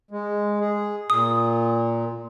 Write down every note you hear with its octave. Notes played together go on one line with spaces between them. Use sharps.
G#3
G#4
A#2 D#6